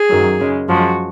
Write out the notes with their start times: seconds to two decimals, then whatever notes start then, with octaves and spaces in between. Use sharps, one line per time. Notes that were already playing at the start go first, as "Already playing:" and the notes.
Already playing: G#4
0.09 F#2 D#3 F#3
0.39 F#2 C#3 G#3
0.68 F#2 F3 G#3 F#4